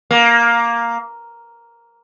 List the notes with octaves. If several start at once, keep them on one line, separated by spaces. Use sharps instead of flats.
A#3